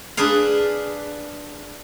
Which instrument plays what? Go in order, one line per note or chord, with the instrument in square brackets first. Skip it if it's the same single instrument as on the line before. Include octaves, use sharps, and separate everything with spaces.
[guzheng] D4 G#4 B4 F5